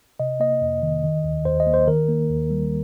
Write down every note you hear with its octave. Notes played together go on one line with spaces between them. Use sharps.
C3 D#5
A#3 D#5
F2
D#3
D#3
D#2
D#2 C5
D#5
A#3
C5
D#3 A#4
A#3
D#2
G3